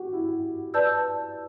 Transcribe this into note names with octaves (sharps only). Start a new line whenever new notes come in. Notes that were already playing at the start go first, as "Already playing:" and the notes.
Already playing: F#4 G4
E4
B4 D5 A5 E6 G6